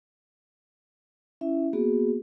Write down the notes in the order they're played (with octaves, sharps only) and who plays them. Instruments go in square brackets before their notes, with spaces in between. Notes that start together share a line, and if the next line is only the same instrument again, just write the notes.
[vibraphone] C#4 E4 E5
A#3 B3 F#4 G#4